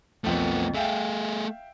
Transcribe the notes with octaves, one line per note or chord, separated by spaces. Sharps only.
B1 F2 F3 A3 B3
A3 G#4 E5 F5 G5